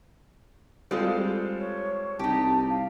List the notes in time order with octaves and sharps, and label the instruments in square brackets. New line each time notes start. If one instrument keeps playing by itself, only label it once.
[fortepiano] G3 F4 A4 [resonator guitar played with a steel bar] G#3 C4
[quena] C#5
[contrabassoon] C2 [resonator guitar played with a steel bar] D#4 G4 [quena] A5
[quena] F5